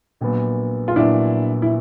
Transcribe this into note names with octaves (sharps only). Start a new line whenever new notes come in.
A#1 A#2 F#3 B3
F4
A#1 A#2 F#3 B3 D4 E4
E4